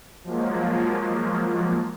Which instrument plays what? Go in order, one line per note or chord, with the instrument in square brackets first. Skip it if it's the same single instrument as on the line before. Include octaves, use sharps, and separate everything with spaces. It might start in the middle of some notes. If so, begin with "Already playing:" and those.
[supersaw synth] F3 F#3 G#3 A#3